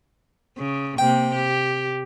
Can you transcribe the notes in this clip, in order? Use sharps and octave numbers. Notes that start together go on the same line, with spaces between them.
C#3
C3 A#3 G5
G4